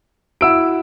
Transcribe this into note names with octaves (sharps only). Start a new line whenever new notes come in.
E4 F#4 E5 F#5 E6 D7